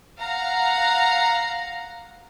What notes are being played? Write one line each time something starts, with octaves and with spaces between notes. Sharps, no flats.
F5 F#5 A#5